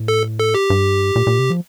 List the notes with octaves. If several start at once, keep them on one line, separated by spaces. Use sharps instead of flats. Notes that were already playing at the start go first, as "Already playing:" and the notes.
Already playing: A2
A4
A4
G4
G2
A#2
A#2
C3
F3